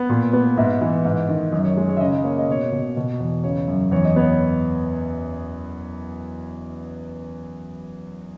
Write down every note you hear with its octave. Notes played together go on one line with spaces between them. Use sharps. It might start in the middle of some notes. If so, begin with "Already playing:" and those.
Already playing: B3
A#2
B3
G#2 E5
E3
G#2
D#3
F#2 D#5
C#5
G#3
C#5
E5
C#3 D#5
A#3 C#5
D#5
B2 C#5
B2
B2
E2
C#3 C#5
F#2
E2 C#5
D#5
B3 C#5